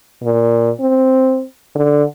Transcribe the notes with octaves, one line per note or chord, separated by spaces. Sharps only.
A#2
C4
D3